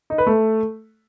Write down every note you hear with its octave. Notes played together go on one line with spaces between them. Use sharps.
D#4
B4
A3